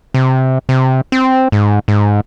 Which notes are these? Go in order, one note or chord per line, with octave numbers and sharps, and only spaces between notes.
C3
C3
C4
G#2
G#2